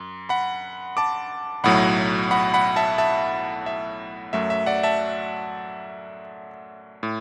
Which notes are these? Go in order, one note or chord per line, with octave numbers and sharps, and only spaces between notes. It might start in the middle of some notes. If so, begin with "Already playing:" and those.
Already playing: F#2
F#5 B5
A5 D6
B1 A2 F#3 F#5 B5
F#5 B5
F#5 B5
E5 A5
E5 A5
E5
F#2 F#3 A3 E5
E5
D5 F#5
E5 A5
A2